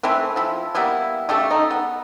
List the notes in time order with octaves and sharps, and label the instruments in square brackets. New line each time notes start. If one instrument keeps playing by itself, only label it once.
[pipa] E3 A3 C4 B4
F3 E4
G3 A#3 B3 E4
C#3 A3 G4 A4
D#4
B3